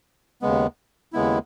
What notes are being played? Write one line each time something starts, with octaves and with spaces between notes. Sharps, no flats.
D#2 C#3 G#3 B3
D#2 C#3 G#3 B3 E4